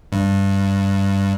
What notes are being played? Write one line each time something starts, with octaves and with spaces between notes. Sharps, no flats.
G2